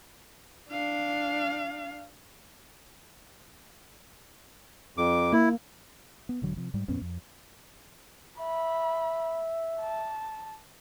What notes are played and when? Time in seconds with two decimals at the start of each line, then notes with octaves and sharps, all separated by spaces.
0.69 D4 F5
4.98 F2 D6
5.33 A#3 E4
6.29 B3
6.42 E1 D3 F#3
6.57 C3 F3
6.74 G#2 G3
6.88 F2 A#2 B3 C#4
7.02 F2
8.40 E5 B5
9.81 A5